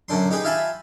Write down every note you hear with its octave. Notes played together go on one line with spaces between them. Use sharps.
F#2 D3 D4 C6
D#4 G4 G#4 B4
F4 G4 E5 G#5 A5 B5